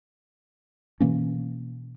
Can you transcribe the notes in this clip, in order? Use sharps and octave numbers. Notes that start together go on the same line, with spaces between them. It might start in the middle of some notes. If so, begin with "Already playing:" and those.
B2 E3 A#3 C#4